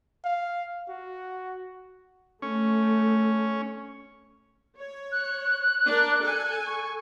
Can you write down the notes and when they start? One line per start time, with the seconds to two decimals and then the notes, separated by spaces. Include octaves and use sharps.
0.25 F5
0.89 F#4
2.42 A3 C#4
4.77 C#5
5.12 F#6
5.87 D4 A#4
6.22 A4 G#5
6.66 C#6